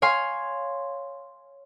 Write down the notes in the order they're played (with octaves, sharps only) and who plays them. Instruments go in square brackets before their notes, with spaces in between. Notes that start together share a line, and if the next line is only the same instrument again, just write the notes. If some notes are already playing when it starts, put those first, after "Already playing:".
[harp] C#5 F5 G#5 C6